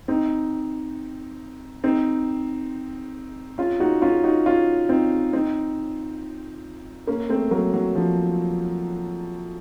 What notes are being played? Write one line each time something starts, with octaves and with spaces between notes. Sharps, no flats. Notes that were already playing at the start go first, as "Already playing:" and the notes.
C4 D#4
C4 D#4
C#4 F4
D#4 F#4
C#4 F4
D#4 F#4
C#4 F4
C4 D#4
C4 D#4
A#3 C#4
A3 C4
F#3 A#3
F#3
F3